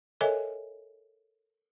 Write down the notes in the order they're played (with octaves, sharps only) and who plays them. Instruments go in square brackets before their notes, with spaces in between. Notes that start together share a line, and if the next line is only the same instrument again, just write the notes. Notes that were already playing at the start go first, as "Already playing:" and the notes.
[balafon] A4 A#4 C#5 D#5 E5 G#5